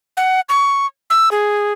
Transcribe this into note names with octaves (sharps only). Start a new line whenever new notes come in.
F#5
C#6
E6
G#4